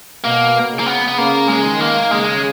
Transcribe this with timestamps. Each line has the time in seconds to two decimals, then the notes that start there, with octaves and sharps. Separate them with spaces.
0.24 B2 A#3
0.71 C#3
0.79 A#3
0.86 B3
1.08 B3
1.17 C#3 A#3
1.48 G#3
1.65 D#3
1.80 A#3
2.10 C#3 G#3